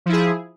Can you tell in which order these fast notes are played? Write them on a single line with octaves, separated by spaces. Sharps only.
F3 E4 G#4